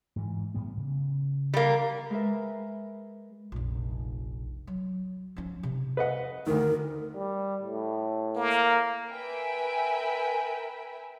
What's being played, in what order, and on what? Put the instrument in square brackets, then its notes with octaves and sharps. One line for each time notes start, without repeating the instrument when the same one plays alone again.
[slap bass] G#2 E3
A2 G3 B3
C#3
[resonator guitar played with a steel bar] G3 A#3
[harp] G#3 A#4 B4 E5
[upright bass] F1 A#1
F#3
F3 C#4
C3
[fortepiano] B4 D#5 F#5
[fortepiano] D2 D#3 [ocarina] A#4
[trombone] G3
A2
[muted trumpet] A#3
[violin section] A#4 B4 E5 G5 G#5